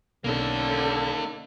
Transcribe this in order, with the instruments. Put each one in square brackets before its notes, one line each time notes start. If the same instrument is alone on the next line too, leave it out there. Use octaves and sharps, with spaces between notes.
[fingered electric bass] B1 [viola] D3 C#4 [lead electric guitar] A#3 D#4 [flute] A4